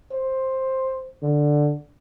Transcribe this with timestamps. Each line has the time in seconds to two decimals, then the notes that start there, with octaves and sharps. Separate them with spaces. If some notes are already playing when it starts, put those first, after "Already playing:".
0.12 C5
1.23 D3